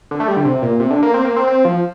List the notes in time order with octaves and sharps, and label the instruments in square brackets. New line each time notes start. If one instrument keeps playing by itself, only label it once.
[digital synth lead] D3
A3
G3
D3
C3
A#2
C3
D3
A#3
C4
A#3
C4
C4
F3